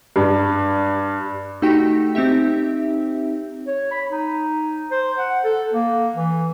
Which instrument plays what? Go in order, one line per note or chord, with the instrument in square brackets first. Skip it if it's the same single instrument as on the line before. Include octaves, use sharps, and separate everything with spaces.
[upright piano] G2
[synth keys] A3 D#4 F#4 G4 G5 B6
C4 D#4 G4 E5
[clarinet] C#5
B5
D#4
C5
F#5
A4
A#3
E3